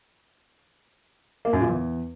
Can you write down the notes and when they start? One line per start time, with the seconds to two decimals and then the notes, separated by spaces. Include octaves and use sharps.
1.45 A#3
1.53 F#2
1.61 A#2
1.69 E2